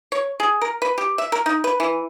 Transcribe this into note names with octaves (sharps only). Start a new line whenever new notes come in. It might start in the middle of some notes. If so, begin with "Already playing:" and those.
C#5
G#4
A#4
B4
G4
E5
A#4
D#4
B4
E3